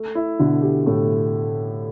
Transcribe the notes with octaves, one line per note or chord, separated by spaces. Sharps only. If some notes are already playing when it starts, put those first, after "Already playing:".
Already playing: A3
E4
B2 D3
G4
A2 A3